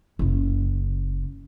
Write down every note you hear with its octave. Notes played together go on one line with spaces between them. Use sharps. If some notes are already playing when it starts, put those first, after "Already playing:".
F#1 C#3